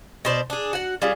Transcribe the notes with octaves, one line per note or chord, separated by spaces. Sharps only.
B2 C5 D5
D4 G#4
F#4 F#5
G3 C#4 F4 G#4